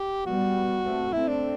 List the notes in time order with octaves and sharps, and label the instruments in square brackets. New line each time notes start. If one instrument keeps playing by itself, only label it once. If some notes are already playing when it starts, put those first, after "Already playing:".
Already playing: [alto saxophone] G4
[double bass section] G3 B3 [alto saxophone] F#4
[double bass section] A3 C4
[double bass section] A3 C4 [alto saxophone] E4
[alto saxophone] D4